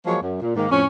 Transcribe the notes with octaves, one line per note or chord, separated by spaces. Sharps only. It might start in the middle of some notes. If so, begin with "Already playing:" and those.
F3 F#3 G#3 A#3 C#5
F#2
A#2
G#2 D#3 A#3
F2 A2 C#4